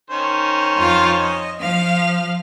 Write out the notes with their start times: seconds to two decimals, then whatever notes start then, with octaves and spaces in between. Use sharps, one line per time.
0.10 D#3 C#4 C5
0.77 F2 F4 F5
1.18 D#5
1.60 F3 F5